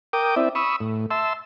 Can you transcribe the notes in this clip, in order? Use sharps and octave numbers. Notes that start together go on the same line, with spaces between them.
A#4 G5 D6 D#6
C4 E4 D5 E5
B5 C#6 D#6 E6
A2
E5 A5 C6 E6